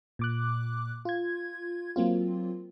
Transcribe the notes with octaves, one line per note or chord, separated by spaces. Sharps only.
A#2 D6 F#6
F4 G#6
F#3 A#3 C4 F4